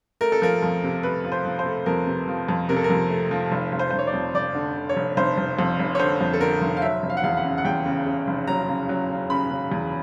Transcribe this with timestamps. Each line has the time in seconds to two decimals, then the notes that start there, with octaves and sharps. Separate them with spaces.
0.21 A3 A#4
0.32 A4
0.42 F3 A#4
0.62 F2
0.83 C3
1.03 A3 B4
1.25 F3
1.32 C5
1.46 F3
1.59 C5
1.66 A3
1.86 F2 A#4
2.07 C3
2.28 F3
2.49 F2
2.69 C3 A#4
2.76 A4
2.84 A#4
2.90 F2
3.10 A3
3.31 F3
3.52 F1
3.72 F1
3.79 C5
3.91 F1 C5
3.99 C#5
4.07 D5
4.14 F2
4.34 F1 D5
4.55 D3
4.75 D3
4.89 C#5
4.96 F1
5.17 F1 C5
5.38 F1
5.59 F2
5.79 F1
5.95 C#5
6.00 D3 C5
6.21 F2
6.33 A4
6.41 D3 A#4
6.61 F1
6.77 F5
6.82 F#3 E5
7.03 F1
7.10 F5
7.17 F#5
7.24 E2 F5
7.37 F#5
7.44 C#3
7.58 F#5
7.65 E2 G5
7.86 C#3
8.06 C#3
8.27 F1
8.47 F#3 A#5
8.68 C#3
8.89 F#3
9.09 C#3
9.30 C#3 B5
9.51 C#3
9.72 E2